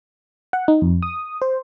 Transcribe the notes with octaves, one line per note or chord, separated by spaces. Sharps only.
F#5
D#4
F2
D#6
C5